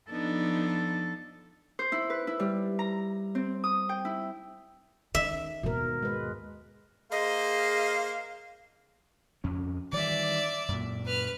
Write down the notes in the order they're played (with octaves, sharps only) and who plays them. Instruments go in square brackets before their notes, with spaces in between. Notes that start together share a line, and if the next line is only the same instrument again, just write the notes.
[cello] F3 A4 [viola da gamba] B3 D4 D#4
[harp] C5
E4
B4
E4
G3
A#5
C4
D#6
G5
E4
[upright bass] D#3 [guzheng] E5
[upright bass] D#2 G#2 [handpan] B2 A#4
[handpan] G#3 B4
[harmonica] A#3 C5 [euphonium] G#4 [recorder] D#5 [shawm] F5
[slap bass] F2 C#4
[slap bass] D#3 E3 G3 [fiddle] D5 E5
[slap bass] F#2 A#2
[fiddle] B4 F6